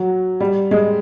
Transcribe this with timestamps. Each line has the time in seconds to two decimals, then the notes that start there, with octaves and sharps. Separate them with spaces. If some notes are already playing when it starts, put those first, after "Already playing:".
Already playing: F#3
0.40 G3
0.71 G#3